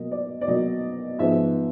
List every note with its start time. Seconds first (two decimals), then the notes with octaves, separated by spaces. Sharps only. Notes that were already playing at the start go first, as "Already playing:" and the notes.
Already playing: B2 F#3 A#3 D#5
0.11 D5
0.41 D5
0.47 B2 F#3 A#3 D#5
1.19 G#2 F3 G#3 B3 E5